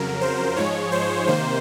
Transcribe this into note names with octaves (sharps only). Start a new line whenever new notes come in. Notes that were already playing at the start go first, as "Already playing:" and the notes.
Already playing: F2 C#3 F#3 A#4
C5
G#2 F3 G#3 C#5
C5
C3 D#3 A#3 C5